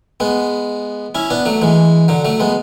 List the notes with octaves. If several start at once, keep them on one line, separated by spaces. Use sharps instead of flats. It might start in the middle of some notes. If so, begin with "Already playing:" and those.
G#3 B3
C#4 E4
B3 D4
F#3 A3
E3 G#3
D3 F#3
F#3 A3
G#3 B3